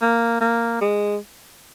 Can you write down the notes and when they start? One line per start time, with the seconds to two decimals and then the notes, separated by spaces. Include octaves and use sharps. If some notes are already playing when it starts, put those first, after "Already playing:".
0.02 A#3
0.41 A#3
0.81 G#3